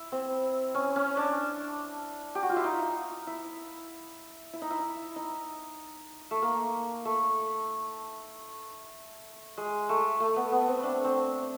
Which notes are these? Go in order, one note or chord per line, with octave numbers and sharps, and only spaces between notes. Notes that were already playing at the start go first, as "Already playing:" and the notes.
Already playing: E4
C4
C#4
C#4
D4
G4
F#4
F4
E4
D#4
E4
E4
D#4
E4
D#4
A3
A#3
A3
G#3
A3
A3
B3
B3
C4
D4
C4